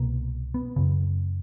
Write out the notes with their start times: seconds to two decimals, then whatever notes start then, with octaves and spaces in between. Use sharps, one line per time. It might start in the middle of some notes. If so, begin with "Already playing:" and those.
Already playing: C2 B2 A#3
0.54 B3
0.76 F#2 C#3